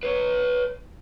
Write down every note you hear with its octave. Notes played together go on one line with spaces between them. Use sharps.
B4 C#5